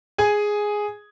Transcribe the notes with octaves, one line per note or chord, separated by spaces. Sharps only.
G#4 G#5